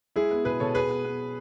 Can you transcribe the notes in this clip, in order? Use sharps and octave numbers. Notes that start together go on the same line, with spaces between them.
G#3 E4 G#4
B3
B2 G#4 B4
B2 A4 C#5
B3 G#4 B4
B3
B3